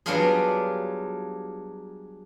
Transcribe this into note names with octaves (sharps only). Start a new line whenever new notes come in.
F#3 G3 B3 D4 F4 G#4